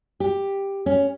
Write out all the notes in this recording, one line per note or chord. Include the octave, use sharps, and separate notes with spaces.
G4
C#4